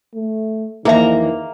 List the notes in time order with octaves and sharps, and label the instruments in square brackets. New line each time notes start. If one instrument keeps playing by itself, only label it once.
[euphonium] A3
[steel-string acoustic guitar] F2 E3 [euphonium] D#3 [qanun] A#3 A#5 [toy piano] G#4 E5